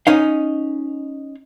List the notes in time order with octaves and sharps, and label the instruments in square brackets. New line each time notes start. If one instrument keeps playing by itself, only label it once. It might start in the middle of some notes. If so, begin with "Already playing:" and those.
[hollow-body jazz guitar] C#4 D#4 F5